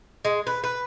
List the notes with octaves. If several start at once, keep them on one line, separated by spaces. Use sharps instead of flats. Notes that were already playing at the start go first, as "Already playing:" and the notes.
G#3
B4
B4